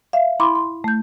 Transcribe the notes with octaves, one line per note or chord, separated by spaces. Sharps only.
E5 F5
E4 B5 C6 D6
C6
A3 G6